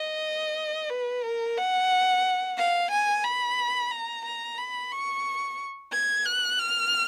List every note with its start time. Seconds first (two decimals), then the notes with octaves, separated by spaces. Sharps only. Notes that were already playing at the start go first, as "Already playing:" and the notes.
Already playing: D#5
0.89 B4
1.23 A#4
1.57 F#5
2.57 F5
2.91 G#5
3.24 B5
3.91 A#5
4.25 A#5
4.58 B5
4.92 C#6
5.92 G#6
6.26 F#6
6.59 F6